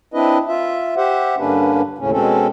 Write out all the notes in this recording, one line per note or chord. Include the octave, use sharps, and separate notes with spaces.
C4 D4 E4 B4 D#5
F4 E5
G4 C5 E5 F#5
G2 D3 A#3 C#4 D4 B4
D#2 A2 C#3 C#4
B2 G#3 C4 C#4 A4